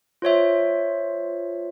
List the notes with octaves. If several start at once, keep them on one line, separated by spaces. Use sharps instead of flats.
F4 C5 C#5 E5